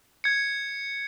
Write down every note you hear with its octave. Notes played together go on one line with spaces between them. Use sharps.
G#6 C#7